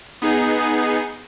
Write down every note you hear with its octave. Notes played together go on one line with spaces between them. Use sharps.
B3 D#4 G#4